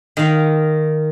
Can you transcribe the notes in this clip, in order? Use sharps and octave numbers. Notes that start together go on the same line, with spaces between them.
D#3 F5